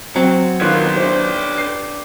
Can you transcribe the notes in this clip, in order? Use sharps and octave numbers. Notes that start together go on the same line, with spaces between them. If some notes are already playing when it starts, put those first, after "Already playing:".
F#3 C4
A#2 D#3 F4 B4 C#5 F#6
D4 E4 G4 C5
C7